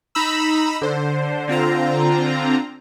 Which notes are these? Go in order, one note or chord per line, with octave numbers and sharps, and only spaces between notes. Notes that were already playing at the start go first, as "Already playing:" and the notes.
D#4 A#5 B5 E6
D3 C5
D3 C4 F4 A#5